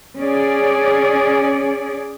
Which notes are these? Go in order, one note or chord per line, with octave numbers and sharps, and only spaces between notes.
C#4 G#4 D5